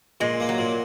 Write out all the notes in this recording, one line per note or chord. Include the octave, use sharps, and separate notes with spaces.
A#2 G#3
A#3
F#3
A#2